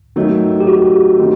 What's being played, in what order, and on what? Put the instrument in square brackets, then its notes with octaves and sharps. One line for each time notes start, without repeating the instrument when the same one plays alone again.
[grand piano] D#3 F#3 A3 D#4
[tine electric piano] G4
F#4
[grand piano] D#3 A3 C4 D#4